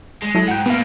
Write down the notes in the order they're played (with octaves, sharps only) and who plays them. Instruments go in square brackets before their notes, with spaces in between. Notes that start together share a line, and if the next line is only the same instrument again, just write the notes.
[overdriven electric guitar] G#3
[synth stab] F#3 E4 A4
[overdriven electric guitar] G#2 [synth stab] F#5 G5
[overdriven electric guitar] A2 A#3 [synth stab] B3 F5